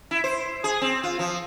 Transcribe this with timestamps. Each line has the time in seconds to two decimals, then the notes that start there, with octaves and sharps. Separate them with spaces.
0.11 E4
0.24 C5
0.64 G#4
0.81 C4
1.03 F4
1.19 F3